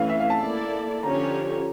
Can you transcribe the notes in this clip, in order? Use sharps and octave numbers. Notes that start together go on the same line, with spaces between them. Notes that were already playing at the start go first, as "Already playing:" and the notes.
Already playing: E3 A3 C#4 F5
E5
F5
A5
A#3 E4 A4 D5
D3 F3 C#4 G4 C#5 A#5